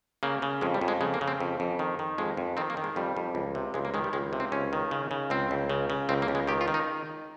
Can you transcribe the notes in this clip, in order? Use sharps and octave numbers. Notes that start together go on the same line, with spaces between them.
C#3 A#3
C#3
F2 G#3
G3
F2
G#3
C#3 G#3
A#3
C#3
C4
F2
F2
D#3
D#3
F2 G#3
F2
D#3 C4
A#3
D#3
G#3
F2 G3
F2
C#2
C3
C#2 G#3
A#3
D#3 G#3
G3
C#2 G#3
C3
C4
C#2 C#4
D#3
C#3
C#3
C#2 C4
C#2
C#3
C#3
C#2 C4
A#3
C#2
G#3
D#3 G4
F4
D#3
D#4